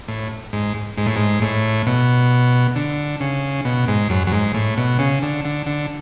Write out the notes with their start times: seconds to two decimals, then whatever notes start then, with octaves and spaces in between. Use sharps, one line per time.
0.08 A2
0.53 G#2
0.97 G#2
1.06 A2
1.16 G#2
1.42 A2
1.87 B2
2.76 D3
3.21 C#3
3.65 B2
3.88 G#2
4.10 F#2
4.27 F#2
4.32 G#2
4.54 A2
4.77 B2
4.99 C#3
5.22 D3
5.45 D3
5.66 D3